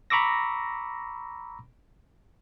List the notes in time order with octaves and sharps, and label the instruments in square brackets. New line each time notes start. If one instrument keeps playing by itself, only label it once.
[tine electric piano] A#5 B5 C#6 D6 E6 A#6